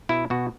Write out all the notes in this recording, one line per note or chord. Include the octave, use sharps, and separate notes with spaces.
B2 E4
B2 F#4